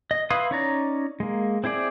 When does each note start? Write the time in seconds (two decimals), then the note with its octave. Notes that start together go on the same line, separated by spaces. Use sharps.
0.11 D#5
0.30 E4 B4 F5 C6 D#6
0.51 C#4 D#4 C#5 D5 A#5
1.20 G#3 A#3
1.64 C4 E4 G#4 D5